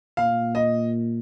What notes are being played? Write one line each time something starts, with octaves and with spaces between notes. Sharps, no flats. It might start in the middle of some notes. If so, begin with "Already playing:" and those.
A#2 F5
D#5